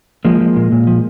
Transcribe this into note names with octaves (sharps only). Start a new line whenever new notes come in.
F3 G#3 A#3
F3
A#2
A#2
F3